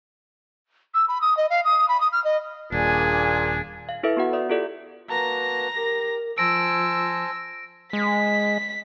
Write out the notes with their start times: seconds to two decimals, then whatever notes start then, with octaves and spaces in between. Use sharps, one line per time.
0.94 E6
1.08 B5
1.21 D#6
1.37 D#5
1.50 F5
1.64 D#6
1.88 B5
2.00 D#6
2.12 F6
2.24 D#5
2.72 D#1 A#2 D4 G#4 G#5
3.89 F5
4.03 E4 A4 B4 E5
4.17 B3 F#4 F#5
4.33 D5 E5 D#6
4.49 F4 G4 A4 D5
5.09 A#3 F#4 B4 A5 A#5 A#6
5.76 G4 A#4
6.38 F3 C5 G#5 A5 E6 A#6 D7
7.93 G#3 B6